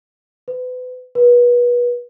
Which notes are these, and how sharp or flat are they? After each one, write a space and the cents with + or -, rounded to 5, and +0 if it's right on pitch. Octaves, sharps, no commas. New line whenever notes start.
B4 +35
B4 -30